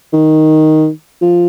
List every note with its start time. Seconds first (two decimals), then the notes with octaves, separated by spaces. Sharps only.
0.13 D#3
1.21 F3